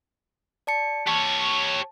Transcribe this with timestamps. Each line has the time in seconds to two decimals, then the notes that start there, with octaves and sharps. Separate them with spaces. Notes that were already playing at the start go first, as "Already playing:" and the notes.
0.67 D5 A5 C#7
1.07 G4 C#5 A5